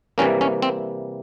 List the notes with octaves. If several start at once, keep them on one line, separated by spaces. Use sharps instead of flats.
C3 E3 G3 A#3 C#4
C#4
C4